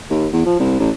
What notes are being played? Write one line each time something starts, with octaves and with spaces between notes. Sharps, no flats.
D#2
E2
F3
C2
A1